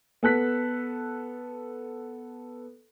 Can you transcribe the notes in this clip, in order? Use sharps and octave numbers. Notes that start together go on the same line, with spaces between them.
B3 A4 F#6 B6